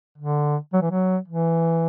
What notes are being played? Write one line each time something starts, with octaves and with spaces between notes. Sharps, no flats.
D3
F#3
E3
F#3
E3